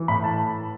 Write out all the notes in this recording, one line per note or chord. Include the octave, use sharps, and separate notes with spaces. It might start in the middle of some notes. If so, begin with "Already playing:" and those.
Already playing: E3
A2 B5
A5